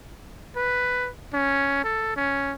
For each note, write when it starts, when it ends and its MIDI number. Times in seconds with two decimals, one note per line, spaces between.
0.56 1.10 71
1.33 1.80 61
1.84 2.16 69
2.16 2.54 61